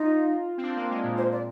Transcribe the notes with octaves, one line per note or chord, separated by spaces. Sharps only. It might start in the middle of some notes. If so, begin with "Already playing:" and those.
Already playing: D#4 F4
C4
D4
A#3
G#3
A#2
A#2 C5
D5